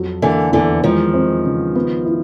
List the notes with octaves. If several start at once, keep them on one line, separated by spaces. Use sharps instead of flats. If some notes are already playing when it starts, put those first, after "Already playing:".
Already playing: F2 F#3
D3 E3 A#3
E2 D3 E3
D#3 F3 G#3
C4
C#3
B3
E4